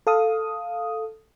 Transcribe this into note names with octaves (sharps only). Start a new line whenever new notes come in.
A4 F5 D#6